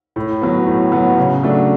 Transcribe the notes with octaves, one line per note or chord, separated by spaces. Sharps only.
A2
F#3 B3
A2
F#3 B3
C#3
F#3 A3 D4